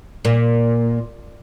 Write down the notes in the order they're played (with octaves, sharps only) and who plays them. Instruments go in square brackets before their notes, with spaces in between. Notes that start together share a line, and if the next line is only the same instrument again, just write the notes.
[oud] A#2